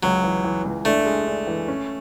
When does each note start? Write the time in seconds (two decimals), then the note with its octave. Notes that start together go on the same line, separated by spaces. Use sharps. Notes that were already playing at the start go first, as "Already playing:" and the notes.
0.03 C#2 F#3
0.24 E3
0.44 E3
0.65 C#2
0.85 A3 D4
1.06 G#3
1.26 D4
1.47 E3
1.68 C#4